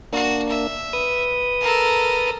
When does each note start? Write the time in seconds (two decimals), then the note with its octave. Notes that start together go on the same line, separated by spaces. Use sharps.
0.13 A#3 D4 F#4
0.49 E5
0.93 B4 D#6
1.61 A4 A#4